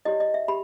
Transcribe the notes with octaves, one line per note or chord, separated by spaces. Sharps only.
E4 G4 C#5 D#5
D#5
E5
G4 B5